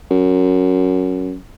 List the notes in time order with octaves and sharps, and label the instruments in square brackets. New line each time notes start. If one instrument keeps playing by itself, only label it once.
[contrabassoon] F#2